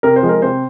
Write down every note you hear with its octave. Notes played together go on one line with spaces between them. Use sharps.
C3 A#4
C5
F3 G#3
A#4
C3 C5